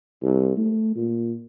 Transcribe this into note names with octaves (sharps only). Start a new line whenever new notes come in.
C2
A3
A#2